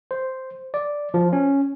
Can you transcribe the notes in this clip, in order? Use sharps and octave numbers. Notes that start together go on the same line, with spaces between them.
C5
D5
F3
C#4